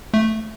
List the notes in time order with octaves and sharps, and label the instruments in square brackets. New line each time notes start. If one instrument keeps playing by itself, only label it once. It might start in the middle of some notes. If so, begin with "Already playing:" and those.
[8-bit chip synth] A3